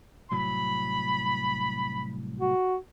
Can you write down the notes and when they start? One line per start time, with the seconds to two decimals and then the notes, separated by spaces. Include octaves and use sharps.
0.32 C2 A2 F#3 B5
2.39 F#4